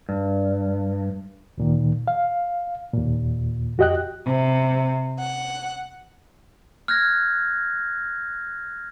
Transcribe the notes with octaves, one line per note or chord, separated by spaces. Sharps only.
G2
D2 A#2 D#3
F5
D#2 A#2
F2 F#4 G4 D#5 G5 F#6
C3
F#5
F6 F#6 G#6 A#6